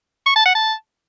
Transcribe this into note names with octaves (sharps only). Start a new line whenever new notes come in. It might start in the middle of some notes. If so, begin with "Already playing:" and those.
C#6
A5
F#5
A5